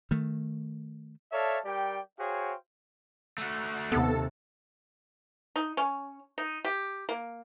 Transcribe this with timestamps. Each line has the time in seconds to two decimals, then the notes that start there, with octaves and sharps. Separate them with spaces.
0.11 D#3 A3
1.32 A4 C#5 D5 E5 F5 A5
1.65 G3 G4 A#4 D5 G5
2.19 F#4 G#4 C5 C#5 F5 G5
3.38 A3 F#4
3.92 D#2 C3 B3 A4
5.56 D#4
5.77 C#4
6.38 D#4
6.65 G4
7.09 A#3